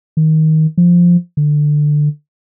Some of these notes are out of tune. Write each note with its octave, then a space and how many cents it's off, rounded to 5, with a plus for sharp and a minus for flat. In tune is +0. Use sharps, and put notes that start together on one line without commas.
D#3 +15
F3 +0
D3 +15